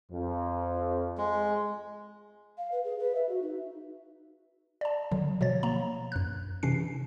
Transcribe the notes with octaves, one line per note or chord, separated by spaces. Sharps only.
F2
G#3
F5
B4
G#4
B4
E5
F#4
D#4
D5 A5
D3 F#3
B2 F3 C#5 A6
A#3 A#5
F#2 F#6
C3 E3 C#4 C7